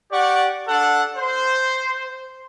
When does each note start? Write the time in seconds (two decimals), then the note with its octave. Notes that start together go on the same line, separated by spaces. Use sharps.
0.12 G4 D5 F#5 C#6
0.67 D4 A4 F#5
1.16 C5